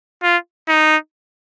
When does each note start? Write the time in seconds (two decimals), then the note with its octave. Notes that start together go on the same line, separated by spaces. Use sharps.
0.23 F4
0.69 D#4